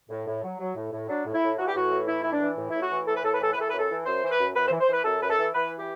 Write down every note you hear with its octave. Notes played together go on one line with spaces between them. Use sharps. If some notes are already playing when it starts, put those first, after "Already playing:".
A2
A2
F#3
F#3
A2
A2
F#3 D4
A2
E4
A2
E3 F#4
G4
A2 F#4
E3
A2 E4
E3 E4
D4
E3
A2
A2 E4
F#4
E3
A2 A4
B4
A2 A4
B4
E3 A4
B4
E3 A4
F#2 B4
A4
E3
F#2 C5
E3 C5
B4
F#2
F#2 B4
C5
E3
C5
E3 B4
F#2 A4
F#2 B4
A4
E3
E3 B4
G4